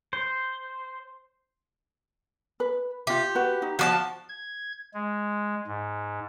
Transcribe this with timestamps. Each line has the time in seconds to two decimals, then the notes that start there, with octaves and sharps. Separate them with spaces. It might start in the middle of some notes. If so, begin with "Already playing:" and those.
0.13 C5
2.60 B4
3.07 F4 G4 E5
3.35 F#4 B4
3.62 D#4
3.79 F3 F#4 D5 A5
4.29 G#6
4.94 G#3
5.67 G#2